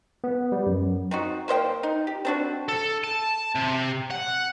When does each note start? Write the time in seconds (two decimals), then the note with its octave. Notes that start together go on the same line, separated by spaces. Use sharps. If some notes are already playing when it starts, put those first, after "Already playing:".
0.24 B3
0.52 G3
0.67 F#2
1.11 C4 D#4 F#4
1.48 A#3 C5 D#5 G5
1.83 D#4
2.07 G4
2.25 C4 D4 F#4
2.68 A4
3.04 A5
3.55 C3
4.11 F#5